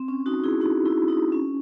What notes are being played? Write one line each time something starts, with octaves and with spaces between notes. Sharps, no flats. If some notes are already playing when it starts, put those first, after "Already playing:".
Already playing: C4
C#4
D#4 F#4
E4 G#4
D#4 F#4
E4
D#4
C#4